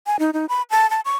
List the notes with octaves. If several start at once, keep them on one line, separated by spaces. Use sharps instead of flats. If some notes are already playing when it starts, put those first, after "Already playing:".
G#5
D#4
D#4
B5
A5
A5
C#6